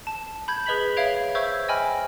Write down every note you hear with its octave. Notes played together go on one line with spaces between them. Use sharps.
A5
B5 G6 G#6
G#4 B4 D#5 B5 B6 F#7
C#5 E5 F5 G#6 D7 F7
C5 E5 C#6 E6 G6 G#6
D#5 G5 G#5 B5 F6